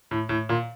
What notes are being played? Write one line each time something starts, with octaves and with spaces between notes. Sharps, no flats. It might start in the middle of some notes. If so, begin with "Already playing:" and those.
A2
A2
A#2